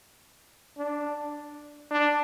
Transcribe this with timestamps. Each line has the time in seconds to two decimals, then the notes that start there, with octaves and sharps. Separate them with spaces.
0.78 D4
1.91 D4